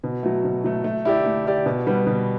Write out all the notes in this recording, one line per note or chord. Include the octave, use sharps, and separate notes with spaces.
B2
F#3 A3
B2
F#3 A3
A3
E4 G4 D5
A3
E4 G4 D5
B2
G3 B3
B2